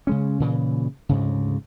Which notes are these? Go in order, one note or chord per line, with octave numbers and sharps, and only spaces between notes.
C#3 G#3 C#4
A#2 C#3 E3
D2 G#2 C#3